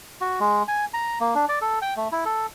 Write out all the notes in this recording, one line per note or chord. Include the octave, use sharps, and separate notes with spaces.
F#4
G#3
G#5
A#5
A#3
D4
D5
A4
G5
A3
E4
A4